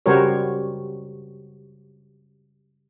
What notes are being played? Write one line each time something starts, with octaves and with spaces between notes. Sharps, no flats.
C#3 G3 F#4 A#4 C5 C#5